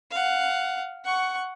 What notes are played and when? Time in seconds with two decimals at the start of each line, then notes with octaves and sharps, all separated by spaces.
0.11 F5 F#5
1.04 F#5 C#6